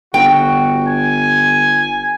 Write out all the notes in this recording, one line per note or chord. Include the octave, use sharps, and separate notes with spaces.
G1 F#4 G5
G#5